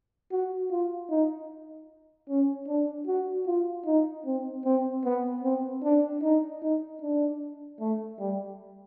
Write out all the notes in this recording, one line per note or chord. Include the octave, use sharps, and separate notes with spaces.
F#4
F4
D#4
C#4
D4
F#4
F4
D#4
C4
C4
B3
C4
D4
D#4
D#4
D4
A3
G3